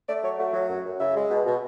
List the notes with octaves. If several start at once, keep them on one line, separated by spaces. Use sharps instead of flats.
A3 D5
F#3 C#5
A3 F#4
F#3
F#2
F#2
C#3 E5
G#3
B2
B2